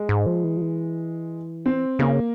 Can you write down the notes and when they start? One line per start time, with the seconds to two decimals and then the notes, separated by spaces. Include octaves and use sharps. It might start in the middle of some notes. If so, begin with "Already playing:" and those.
Already playing: G#3
0.09 G#2
0.26 F3
0.44 E3
0.57 F3
0.61 E3
1.66 C4
1.99 C#3 A#3